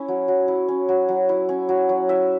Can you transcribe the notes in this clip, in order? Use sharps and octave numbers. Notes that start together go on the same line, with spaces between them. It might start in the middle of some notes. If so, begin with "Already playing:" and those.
Already playing: C#4 E4
F#3
F#3
E4
C#4
F#3
F#3
E4
C#4
F#3
F#3
E4 E5